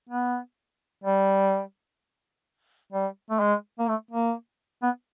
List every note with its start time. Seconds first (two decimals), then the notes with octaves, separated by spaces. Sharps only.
0.09 B3
1.04 G3
2.93 G3
3.30 A3
3.40 G#3
3.79 A#3
3.88 A3
4.11 A#3
4.83 B3